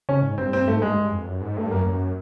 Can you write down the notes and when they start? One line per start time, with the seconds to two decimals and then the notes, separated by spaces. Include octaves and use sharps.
0.09 C#3 C#4
0.22 G#2
0.38 G2 C4
0.53 C4
0.68 G#2 A3
0.82 G2 G#3
0.97 G2
1.11 F2
1.26 F#2
1.41 G#2
1.57 G2 A3
1.71 F#2 A#3
1.86 F#2